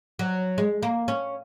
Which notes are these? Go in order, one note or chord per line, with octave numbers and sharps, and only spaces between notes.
F#3
G#3
A#3
C#4